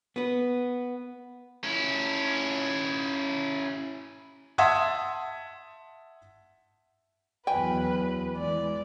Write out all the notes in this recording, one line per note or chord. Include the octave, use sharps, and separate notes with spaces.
B3 B4
C#4 E4
E5 F#5 A5 C6 D#6 G#6
E2 F#3 B4 G5 G#5
E3 G#3 D5